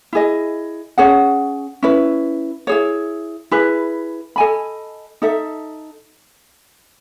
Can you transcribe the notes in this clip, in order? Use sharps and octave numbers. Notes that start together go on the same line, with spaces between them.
E4 G#4 D#5
C#4 G#4 C#5 F#5
C#4 E4 B4
E4 G#4 C#5
E4 G#4 B4
A4 D#5 G#5 B5
D#4 A4 E5